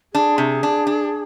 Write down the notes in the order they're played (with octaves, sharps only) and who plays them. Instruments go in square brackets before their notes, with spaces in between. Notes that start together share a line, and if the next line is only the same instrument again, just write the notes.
[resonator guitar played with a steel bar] D4 [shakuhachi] G#4
[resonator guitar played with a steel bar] C3
D4
D4